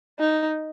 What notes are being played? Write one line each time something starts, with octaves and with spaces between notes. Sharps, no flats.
D#4